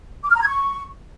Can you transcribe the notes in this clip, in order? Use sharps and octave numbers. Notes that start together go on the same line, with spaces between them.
D6
F6
A#5
G#6
C#6